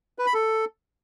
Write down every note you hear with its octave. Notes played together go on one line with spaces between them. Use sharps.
B4
B5
A4